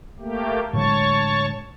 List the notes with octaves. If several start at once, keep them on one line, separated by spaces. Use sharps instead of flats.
A3 A#3 G4
A2 D3 G#3 C#5 A5 C#6